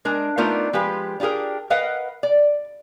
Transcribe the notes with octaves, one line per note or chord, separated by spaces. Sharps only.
G#3 D4 A#4
A3 B3 D4 D#4 F4 A#4
F3 G#3 G4 B4
D4 F4 G4 G#4 A#4
A#4 B4 D#5 F5 F#5
D5